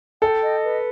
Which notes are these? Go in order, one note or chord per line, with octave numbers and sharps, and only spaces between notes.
A4 G5
D#5
B4